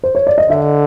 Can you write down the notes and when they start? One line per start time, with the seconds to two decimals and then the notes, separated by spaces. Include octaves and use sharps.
0.04 C5
0.15 C#5
0.27 D5
0.38 D#5
0.50 D3 E5